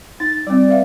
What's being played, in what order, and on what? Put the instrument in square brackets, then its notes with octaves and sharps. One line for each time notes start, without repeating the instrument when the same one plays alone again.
[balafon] D#4 [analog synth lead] A6
[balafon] G3 C4 [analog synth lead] D5
[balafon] B4 E5 F5